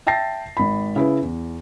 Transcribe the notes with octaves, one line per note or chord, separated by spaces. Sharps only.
E5 G5 A5 A6 A#6 C7
G#1 B5
C#3 E4 B4
E2